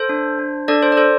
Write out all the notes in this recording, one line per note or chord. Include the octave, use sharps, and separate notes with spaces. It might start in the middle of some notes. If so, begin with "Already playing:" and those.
Already playing: A4 C5
D4
D4
D4 A4 D5
C5
D5
A4 C5